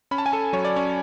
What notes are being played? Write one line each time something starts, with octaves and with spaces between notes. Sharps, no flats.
C#4 B5
A5
G#5
A4 A5
F#3 C#5
D5
C#4 C#5